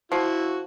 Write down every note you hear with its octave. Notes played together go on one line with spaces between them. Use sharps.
F3 E4 F#4